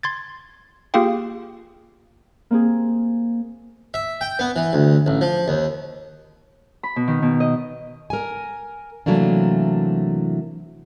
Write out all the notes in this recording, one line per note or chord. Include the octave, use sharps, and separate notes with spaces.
C6 G#6 A6
A#3 F4 G4 G#4 F5 G5
A#3 C4 G#4
E5
G5
B3
E3
D2
A1
F3
D#2
B5
B2
D#3
B2
D#5
A#4 G#5
C3 E3 F#3 A3 A#3 D4